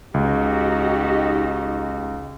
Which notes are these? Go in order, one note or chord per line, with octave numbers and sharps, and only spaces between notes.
C#2 D#4 F#4 G4